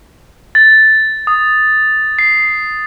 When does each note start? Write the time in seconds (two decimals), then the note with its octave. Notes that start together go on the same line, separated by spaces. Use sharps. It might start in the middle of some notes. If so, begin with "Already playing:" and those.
0.55 A6
1.27 D#6
2.19 C7